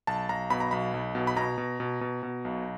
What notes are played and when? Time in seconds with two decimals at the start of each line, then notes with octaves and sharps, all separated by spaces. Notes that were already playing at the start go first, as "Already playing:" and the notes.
0.07 B1 A5
0.29 B1 A#5
0.50 B2 B5
0.60 A#5
0.71 B1 B5
0.94 B1
1.15 B2
1.27 B5
1.36 B2 A#5
1.58 B2
1.80 B2
2.01 B2
2.23 B2
2.45 B1